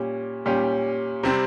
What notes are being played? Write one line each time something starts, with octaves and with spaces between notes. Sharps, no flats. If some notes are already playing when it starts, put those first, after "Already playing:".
Already playing: A#2 G3 C#4 G4
A#2 G3 C#4 G4
C3 G3 C4